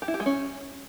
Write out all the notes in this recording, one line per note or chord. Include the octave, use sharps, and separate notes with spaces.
G4
E4
G4
G#3
C#4